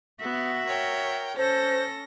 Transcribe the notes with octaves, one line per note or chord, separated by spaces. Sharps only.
B3 F#4 E5
A#4 C#5 G5
C#4 A4 C5 A#6